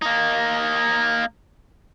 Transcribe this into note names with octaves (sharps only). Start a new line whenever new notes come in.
A#3 D#4